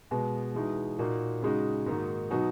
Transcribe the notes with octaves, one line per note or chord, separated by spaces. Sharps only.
B2 G#3 B3
E3 G#3 D#4 F#4
A#2 A#3 D#4 F#4
C#3 G#3 D#4 F#4
G#2 D#3 A#3 D#4 F#4
B2 F#3 B3 D#4 F#4